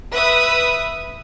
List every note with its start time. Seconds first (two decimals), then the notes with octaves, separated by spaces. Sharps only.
0.12 B4 E5 D#6